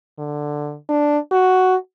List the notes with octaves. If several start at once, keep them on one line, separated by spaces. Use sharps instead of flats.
D3
D4
F#4